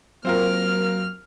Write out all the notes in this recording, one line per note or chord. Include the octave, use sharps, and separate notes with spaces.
F#3 A#3 C4 F4 A#4 F6